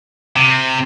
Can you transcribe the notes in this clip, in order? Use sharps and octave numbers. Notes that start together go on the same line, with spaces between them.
C3